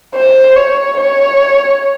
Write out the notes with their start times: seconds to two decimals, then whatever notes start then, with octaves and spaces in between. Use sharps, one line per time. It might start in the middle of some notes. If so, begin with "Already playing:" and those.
0.15 C5
0.56 C#5
0.97 C#5